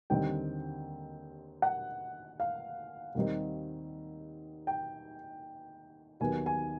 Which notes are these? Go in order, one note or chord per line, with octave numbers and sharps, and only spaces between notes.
D#2 D3 G3 C4 D#4 G5
F#5
F5
D#2 D#3 G3 C4 D#4
G5
D#2 D#3 F#3 B3 G#5
G#5